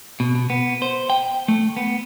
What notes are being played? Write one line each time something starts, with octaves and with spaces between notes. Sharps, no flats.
B2
B2
B3
C5
G5
A3
B3